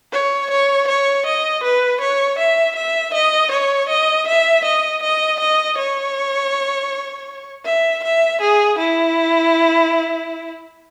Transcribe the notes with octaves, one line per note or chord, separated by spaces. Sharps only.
C#5
C#5
C#5
D#5
B4
C#5
E5
E5
D#5
C#5
D#5
E5
D#5
D#5
D#5
C#5
E5
E5
G#4
E4